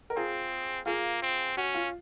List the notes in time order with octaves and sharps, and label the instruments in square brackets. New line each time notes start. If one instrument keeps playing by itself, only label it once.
[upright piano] A#4
[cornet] C4 [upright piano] F4 G#4
[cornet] A#3 [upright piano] F4 G#4
[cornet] C4
[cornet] C#4 [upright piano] F#4
[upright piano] F4